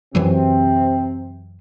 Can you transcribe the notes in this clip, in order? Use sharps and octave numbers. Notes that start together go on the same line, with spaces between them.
F#2 C3 E3 F#3 C4